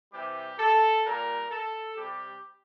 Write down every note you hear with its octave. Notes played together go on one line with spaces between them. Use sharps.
C3 E3 G3 G4
A4
A#2 G3 A#4
A4
C3 G3 G4